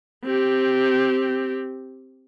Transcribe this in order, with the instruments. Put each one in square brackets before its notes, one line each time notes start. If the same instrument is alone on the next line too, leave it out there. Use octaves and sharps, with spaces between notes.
[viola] C4 G4